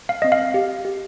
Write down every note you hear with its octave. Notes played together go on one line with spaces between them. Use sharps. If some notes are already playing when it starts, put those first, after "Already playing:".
F5
C4 D#5
F5
G4
G4